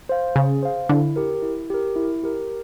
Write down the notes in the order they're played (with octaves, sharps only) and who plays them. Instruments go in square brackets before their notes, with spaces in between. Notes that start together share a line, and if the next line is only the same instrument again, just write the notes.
[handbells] C5 F5
[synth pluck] C#3 [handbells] G#4
[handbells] C5 F5
[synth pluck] D3 [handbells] E4
[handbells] G4 A#4
E4
G4 A#4
E4
G4 A#4